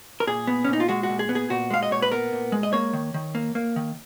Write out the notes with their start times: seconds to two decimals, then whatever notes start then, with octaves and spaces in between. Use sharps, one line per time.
0.20 A#4
0.27 A#2 G#4
0.47 B3
0.64 C#4
0.68 A#2 D#4
0.80 F4
0.89 G#3 F#4
1.03 F#4
1.09 A#2
1.19 G#4
1.29 B3
1.35 G#4
1.50 A#2 F#4
1.70 G#3 F5
1.83 D#5
1.91 A#2 C#5
2.02 B4
2.12 B3 A#4
2.33 A#2
2.52 G#3
2.63 D#5
2.73 A#3 C#5
2.93 D#3
3.14 D#3
3.35 A#3
3.55 A#3
3.76 D#3